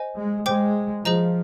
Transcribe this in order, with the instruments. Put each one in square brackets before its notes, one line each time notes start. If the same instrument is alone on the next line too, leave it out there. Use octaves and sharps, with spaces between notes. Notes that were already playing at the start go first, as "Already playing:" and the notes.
Already playing: [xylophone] C5 D#5 G#5
[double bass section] G#3
[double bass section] G#3 [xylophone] C5 G5 D6
[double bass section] F3 [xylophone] G#4 C5 D#5 A#5